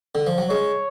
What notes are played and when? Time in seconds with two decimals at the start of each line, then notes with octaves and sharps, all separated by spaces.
0.15 D3
0.27 F3
0.38 F#3
0.50 G#3 C#5